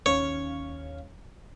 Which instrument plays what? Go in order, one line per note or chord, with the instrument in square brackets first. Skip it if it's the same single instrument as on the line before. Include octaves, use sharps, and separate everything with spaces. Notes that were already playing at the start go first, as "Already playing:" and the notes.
[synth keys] D#2 C#4 F5 [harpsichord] C#5